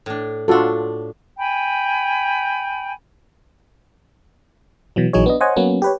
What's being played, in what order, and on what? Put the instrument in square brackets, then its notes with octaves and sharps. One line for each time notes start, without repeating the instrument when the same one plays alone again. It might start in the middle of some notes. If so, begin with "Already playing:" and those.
[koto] A2 D4
[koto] A2 D4 [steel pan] F4 F#4 A4
[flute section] G5 G#5 B5
[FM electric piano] B2 E3 F#3
A#1 E3 F#3 D#4 G#4 C#5
B3 D4 D#5
C5 C#5 D#5 F#5 G#5
F#3 A#3 B3 C#4
G4 B4 C#5